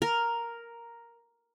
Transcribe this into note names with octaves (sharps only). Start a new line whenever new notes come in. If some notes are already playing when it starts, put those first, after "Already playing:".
A#4